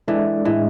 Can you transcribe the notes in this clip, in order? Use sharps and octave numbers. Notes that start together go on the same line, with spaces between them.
E3 G#3 D4 A4 D5
A2 E3 G#3 D4